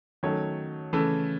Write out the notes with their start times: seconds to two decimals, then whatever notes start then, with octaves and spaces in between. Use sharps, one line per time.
0.23 D#3 F#3 A3 C#4 C#5
0.93 C#3 E3 A3